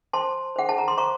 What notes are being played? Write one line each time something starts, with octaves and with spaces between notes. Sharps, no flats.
C5 A5 C6
C5 F#5
A5
A#5
C6
C5 A#5 C#6